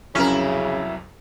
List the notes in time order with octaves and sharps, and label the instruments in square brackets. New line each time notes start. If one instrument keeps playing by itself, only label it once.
[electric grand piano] C2 F2 F#3 [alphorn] C#3 [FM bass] C#4 [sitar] E4 A#4